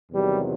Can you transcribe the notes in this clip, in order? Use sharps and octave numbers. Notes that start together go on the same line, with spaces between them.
E2 C3 D#3 F#3 G3